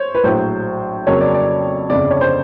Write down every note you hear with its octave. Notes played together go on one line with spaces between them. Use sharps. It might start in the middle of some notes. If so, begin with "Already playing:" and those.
Already playing: C5 C#5
B4
A#1 A2 F#3 C5
F2 C#3 F#3 A#3 C#5
D5
D5
G1 F2 C#3 D5
C#5
C5